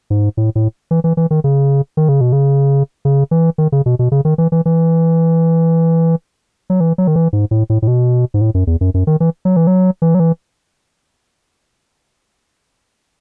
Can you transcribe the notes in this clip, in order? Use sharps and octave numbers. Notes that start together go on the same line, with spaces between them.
G#2
A2
A2
E3
E3
E3
D#3
C#3
D#3
C#3
B2
C#3
C#3
E3
D#3
C#3
B2
B2
C#3
D#3
E3
E3
E3
F#3
E3
F#3
D#3
E3
G#2
A2
A2
A2
B2
G#2
A2
F#2
E2
F#2
F#2
D#3
E3
F#3
E3
F#3
E3
F#3
E3